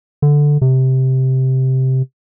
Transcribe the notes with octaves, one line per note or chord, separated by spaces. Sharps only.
D3
C3